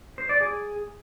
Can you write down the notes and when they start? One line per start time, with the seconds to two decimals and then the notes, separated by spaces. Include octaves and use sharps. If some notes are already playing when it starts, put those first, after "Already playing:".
0.18 C5
0.29 D5
0.41 G#4